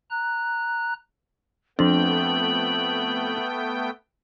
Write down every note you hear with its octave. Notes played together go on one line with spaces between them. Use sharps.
A#5 F#6
F2 F3 A3 B3 D4 G5 F#7